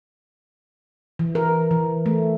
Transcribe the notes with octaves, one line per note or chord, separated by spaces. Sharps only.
E3
A#4
E3
A3